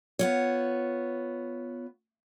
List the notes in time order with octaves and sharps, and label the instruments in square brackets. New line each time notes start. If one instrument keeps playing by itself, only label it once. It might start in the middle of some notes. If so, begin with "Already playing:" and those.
[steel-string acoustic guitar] B3 F4 C#5